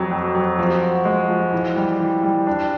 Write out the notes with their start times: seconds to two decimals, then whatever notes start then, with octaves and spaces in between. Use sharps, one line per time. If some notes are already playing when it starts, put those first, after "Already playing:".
Already playing: F2 F#3
0.11 F2
0.35 F#3
0.59 F3
0.82 F#4
1.05 G#3
1.29 F3
1.53 E3
1.77 G3
2.00 E3
2.23 G3
2.47 D4